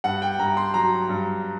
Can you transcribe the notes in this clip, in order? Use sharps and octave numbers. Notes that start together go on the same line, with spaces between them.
G2 F#5
G5
G2 A#5
C6
F#3 A#5
G2